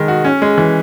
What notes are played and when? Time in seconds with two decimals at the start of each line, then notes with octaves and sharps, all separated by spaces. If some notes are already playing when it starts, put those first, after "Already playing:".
Already playing: D#3 G#3 D#4
0.08 F#4
0.25 C#4
0.42 G#3
0.58 E3